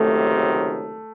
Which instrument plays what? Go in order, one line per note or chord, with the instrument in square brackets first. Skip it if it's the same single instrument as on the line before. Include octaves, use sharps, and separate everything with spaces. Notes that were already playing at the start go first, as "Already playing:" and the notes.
Already playing: [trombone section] C#2 C3 D#3 F#3 [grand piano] A3